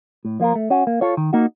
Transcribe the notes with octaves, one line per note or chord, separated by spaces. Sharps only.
A2
F3 A#3 F4 A#4
A3
C#4 F#4
A#3
F4 A4 C#5
D#3
A#3 D#4 F#4